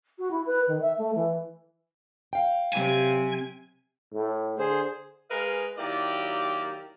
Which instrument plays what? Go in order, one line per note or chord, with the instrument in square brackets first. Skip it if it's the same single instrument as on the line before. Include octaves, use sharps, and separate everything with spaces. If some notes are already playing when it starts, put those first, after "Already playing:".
[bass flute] F#4
E4
B4
D#3
E5
A3
E3
[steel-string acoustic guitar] F5 G5
[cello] C3 C4 [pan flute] F#3 [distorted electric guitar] G#5
[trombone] A2
[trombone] D3 [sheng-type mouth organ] G#4 C5
[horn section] G#3 G#4 A#4 B4 D#5 F5
D#3 F#3 A#3 E4 G4 D5